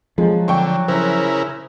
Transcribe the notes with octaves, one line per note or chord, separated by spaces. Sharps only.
F3 F#3 G#3
D3 G5 C#6
C#3 E4 A#4 C5